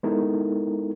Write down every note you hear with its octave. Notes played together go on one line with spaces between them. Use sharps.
G#3 B3 D#4 E4 A4 A#4